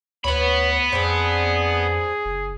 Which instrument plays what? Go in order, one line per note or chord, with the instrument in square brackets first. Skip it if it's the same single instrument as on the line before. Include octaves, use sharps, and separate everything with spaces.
[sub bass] D2 [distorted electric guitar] B3 B5 [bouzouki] B4 C#5
[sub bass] F2 [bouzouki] C4 D4 [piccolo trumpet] G#4
[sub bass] F#1